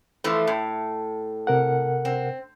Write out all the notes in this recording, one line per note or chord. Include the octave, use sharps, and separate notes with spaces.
E3 F3 A3
A2
C3 A#4 F#5
C4